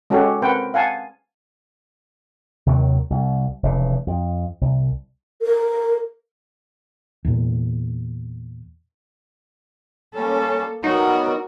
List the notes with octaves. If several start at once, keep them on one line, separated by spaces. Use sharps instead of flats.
G#3 C#4 F#4 G4 A4
C4 A#4 B4 F#5 G5
F5 F#5 G#5 A5
D#2 C3 D#3 F#3
C2
F1 C#3 E3
F2
C2
A#4
E2 A#2
G3 A#3 C#4 A4
F#3 G3 B3 D#4 F#4 A#4